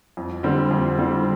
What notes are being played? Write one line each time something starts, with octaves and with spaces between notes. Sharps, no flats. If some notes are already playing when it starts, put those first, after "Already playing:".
F2
D3 G3 C4
F2
D3 G3 C4